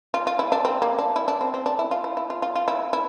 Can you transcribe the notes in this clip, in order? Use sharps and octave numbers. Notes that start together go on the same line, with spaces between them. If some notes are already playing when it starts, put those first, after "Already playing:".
F4
F4
E4
D4
C4
A#3
D4
E4
D4
C4
C4
D4
E4
F4
E4
E4
F4
F4
F4
E4
E4